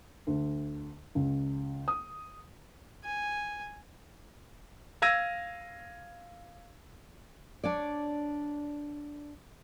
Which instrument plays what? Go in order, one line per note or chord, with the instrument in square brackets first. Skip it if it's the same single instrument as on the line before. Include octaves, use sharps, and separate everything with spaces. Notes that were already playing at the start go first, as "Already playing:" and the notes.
[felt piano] D2
C#2
D#6
[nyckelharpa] G#5
[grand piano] F5 E6 G#6 A#6 D#7
[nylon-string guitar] D4 C#5 D5